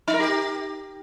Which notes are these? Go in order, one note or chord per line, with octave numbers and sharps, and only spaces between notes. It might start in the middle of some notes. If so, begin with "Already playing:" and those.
D#4
A#4
G4